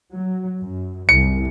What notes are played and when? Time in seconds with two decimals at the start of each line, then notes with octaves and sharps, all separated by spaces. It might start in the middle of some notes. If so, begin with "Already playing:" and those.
0.11 F#3
0.57 F#2
1.09 C2 C#7